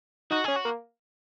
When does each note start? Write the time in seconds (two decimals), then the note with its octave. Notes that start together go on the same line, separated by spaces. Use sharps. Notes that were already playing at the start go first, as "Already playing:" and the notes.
0.31 D#4 F#4
0.44 C#4 G#4
0.56 F#4
0.65 A#3